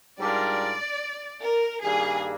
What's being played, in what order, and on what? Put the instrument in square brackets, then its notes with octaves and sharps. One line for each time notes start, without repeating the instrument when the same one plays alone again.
[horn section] G#2 G3 D4 F4 A#4 [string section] D5
[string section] A#4
[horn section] G2 D#3 G3 A#3 [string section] G#4